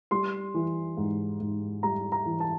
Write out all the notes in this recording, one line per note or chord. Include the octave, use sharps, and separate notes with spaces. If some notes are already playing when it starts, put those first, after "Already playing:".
G3 C6
E3
G#2
G#2
G3 A#5
A#5
E3
A5